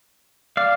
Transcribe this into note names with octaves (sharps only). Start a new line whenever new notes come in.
D5 F5